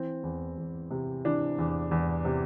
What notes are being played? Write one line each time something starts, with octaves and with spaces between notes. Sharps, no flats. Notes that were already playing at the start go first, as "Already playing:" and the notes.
Already playing: E3 C4
E2
E2
C3
E3 D4
E2
E2
C3